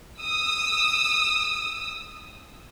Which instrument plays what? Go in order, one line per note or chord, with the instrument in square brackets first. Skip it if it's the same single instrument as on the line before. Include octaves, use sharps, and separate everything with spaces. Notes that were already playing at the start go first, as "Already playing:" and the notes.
[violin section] D#6 E6